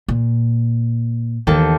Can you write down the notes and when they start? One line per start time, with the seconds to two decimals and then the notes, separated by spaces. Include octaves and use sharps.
0.08 A#2
1.47 D#2 E3 B3 A4 G5